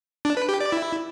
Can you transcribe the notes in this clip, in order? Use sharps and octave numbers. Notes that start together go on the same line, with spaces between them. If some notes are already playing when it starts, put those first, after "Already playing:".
D4
B4
G4
D5
E4